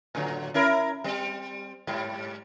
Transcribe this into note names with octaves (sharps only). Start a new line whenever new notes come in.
A2 D3 F#3
C#4 E4 A#4
G3 C4
G#2 G3